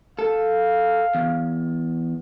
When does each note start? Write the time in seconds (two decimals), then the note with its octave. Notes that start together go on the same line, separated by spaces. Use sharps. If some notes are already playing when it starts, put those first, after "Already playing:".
0.19 A4 F5
1.15 E2